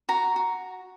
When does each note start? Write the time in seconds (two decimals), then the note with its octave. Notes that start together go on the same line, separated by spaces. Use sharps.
0.09 F#4 A#5
0.36 F#4